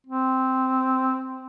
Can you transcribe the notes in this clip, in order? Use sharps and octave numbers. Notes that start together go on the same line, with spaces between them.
C4